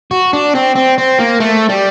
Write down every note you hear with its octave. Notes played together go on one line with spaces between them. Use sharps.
F#4
D4
C4
C4
C4
A#3
A3
G3